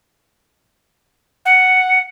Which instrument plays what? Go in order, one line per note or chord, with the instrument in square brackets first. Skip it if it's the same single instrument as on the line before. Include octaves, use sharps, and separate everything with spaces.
[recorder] F#5